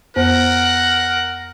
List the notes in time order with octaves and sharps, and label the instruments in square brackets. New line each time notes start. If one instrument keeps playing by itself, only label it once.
[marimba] F2 B3 C5 [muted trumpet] A#4 [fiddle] F#5